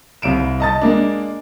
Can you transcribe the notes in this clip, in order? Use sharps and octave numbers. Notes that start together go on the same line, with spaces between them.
C2 F5 D7 E7
D#5 A5 A6
G#3 A#3 D4